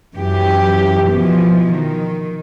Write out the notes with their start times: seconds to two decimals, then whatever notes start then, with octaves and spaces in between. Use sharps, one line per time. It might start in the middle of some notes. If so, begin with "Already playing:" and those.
0.14 F#2 E3 G4
1.06 B2 E3 F3
1.71 D#3